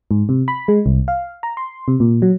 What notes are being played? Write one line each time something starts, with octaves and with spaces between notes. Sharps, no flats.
G#2
C3
B5
G#3
C2
F5
A#5
C6
C3
A#2
F#3